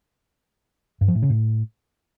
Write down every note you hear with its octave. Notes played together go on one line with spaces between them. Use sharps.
G2
F3
A2
C#3
A2